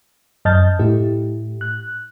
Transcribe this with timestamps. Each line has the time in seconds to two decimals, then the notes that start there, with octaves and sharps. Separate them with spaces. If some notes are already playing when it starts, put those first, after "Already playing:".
0.45 F#2 D#5 A5 F6 G6 A6
0.79 A2 A3 E4 G4
1.61 F#6